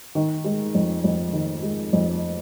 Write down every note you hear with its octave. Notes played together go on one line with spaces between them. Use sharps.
D#3
G#3
F2
F2
D#3
G#3
F2